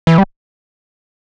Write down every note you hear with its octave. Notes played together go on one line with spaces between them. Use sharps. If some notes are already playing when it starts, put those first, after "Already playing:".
E3
G3